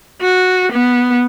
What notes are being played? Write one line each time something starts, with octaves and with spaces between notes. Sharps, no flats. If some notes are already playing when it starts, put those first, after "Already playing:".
F#4
B3